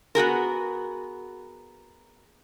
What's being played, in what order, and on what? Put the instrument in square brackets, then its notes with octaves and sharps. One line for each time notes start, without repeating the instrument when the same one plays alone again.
[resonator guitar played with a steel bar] B3 F#4 G#4 A#4